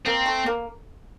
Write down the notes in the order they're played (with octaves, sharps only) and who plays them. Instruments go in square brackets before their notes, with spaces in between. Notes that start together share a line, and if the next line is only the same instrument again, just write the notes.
[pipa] A#3 [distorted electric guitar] C4
[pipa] A3
A#3